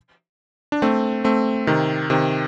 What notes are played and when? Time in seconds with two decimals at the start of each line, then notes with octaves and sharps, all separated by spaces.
0.72 D4
0.82 A3 C4
1.24 A3 C4
1.67 C3 D#3
2.10 C3 D#3